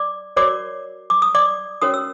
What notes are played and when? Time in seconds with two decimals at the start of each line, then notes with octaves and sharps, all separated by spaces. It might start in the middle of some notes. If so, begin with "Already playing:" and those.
Already playing: D5 D6
0.36 F#4 A#4 C#5 D5 D6
1.10 D6
1.22 D#6
1.35 D5 D6
1.82 C#4 F#4 A#4 C#5 D#6
1.94 E6